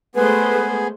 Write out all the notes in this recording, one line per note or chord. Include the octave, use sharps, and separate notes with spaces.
G#3 A3 B3 G#4 B4 C5